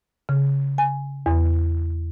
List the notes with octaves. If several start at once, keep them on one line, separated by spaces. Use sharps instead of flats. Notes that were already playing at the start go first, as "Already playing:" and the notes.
C#3
G#5
E2